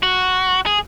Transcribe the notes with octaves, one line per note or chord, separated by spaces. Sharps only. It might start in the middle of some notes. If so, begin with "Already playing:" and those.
F#4
G#4